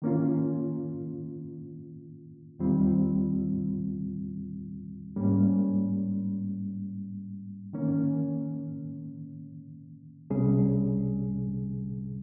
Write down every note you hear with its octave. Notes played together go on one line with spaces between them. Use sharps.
D#3 A#3 C#4 F4
D#2 D#3 G3 C4 F4
G#2 G3 A#3 C#4
D#3 A#3 C#4
C2 C3 G3 C#4 G#4